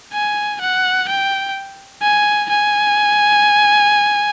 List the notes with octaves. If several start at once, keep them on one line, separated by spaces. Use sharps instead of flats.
G#5
F#5
G5
G#5
G#5